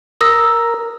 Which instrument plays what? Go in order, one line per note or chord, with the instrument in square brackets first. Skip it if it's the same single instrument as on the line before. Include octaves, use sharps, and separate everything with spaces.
[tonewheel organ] A#4 [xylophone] D#6 E6 A#6